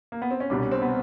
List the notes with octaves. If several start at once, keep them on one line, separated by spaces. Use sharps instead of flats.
A#3
B3
C4
C#4
C2 B2 G3 D4
C#4
C4
B3